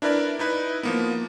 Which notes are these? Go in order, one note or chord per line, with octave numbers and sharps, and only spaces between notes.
D4 E4 A#4 B4 D5
D#4 E4 B4
F3 A#3 B3